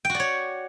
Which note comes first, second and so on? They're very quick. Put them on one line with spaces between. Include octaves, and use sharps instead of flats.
G5 F#4 D5 C#5